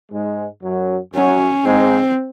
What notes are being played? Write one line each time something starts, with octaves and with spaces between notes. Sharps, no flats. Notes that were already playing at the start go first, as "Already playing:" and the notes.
G#2 G#3
F#2 F#3
F#2 F#3 C#4
G#2 G#3 C4